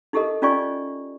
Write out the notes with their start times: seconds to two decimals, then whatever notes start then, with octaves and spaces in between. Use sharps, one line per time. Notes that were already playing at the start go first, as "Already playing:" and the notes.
0.13 D#4 E4 G4 A4 A#4 D#5
0.42 C#4 D#4 F4 D5 G#5 C#6